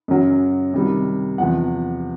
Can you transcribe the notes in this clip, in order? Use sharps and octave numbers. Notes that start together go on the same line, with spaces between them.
F#2 C#3 F#3
C3 D#3 G3
E2 C3 F3 F#5